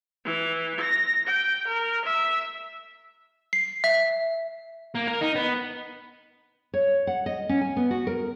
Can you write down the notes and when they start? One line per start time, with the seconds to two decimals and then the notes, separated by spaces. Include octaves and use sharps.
0.24 E3
0.80 A#6
1.26 G5
1.66 A#4
2.03 E5
3.53 C7
3.84 E5
4.95 A#3
5.07 A#4
5.21 D#4
5.36 B3
6.74 C#5
7.07 F#5
7.26 D#5
7.49 C#4
7.61 G#5
7.77 B3
7.91 F#4
8.07 A#4